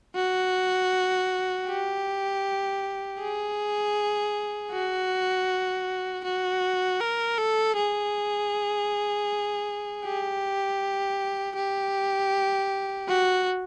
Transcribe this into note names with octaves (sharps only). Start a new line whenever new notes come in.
F#4
G4
G#4
F#4
F#4
A#4
A4
G#4
G4
G4
F#4